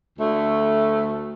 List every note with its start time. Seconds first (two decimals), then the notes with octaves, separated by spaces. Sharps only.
0.19 D2 A3